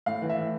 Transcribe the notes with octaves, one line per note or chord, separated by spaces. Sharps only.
A2 F5
E3
E5
A2